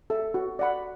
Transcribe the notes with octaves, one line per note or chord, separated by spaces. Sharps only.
A4 E5
F#4
D5 F#5 B5